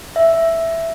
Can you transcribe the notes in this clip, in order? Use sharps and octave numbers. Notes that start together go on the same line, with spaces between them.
E5